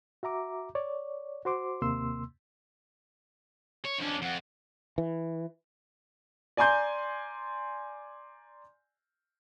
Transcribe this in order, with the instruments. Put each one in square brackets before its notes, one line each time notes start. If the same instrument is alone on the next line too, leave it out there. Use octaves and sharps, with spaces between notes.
[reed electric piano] F#4 E5 A#5 D6
C#5 D5
F#4 C5 C6 D6
D#2 C3 A#3 C6 E6
[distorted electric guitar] C#5
[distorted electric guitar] F2 C#4 [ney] D4
[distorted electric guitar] F2 [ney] F#5
[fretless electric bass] E3
[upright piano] D5 G#5 A#5 C6 G6